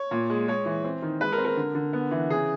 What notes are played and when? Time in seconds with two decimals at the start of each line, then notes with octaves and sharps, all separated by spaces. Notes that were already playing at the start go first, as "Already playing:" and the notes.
Already playing: C#5
0.11 A#2
0.30 G#3
0.48 G#3 C#5
0.65 E3
0.84 C4
1.02 D#3
1.20 G#3 B4
1.32 A#4
1.38 C4
1.45 A#4
1.57 D3
1.75 D3
1.93 B3
2.11 E3
2.30 C#3 G#4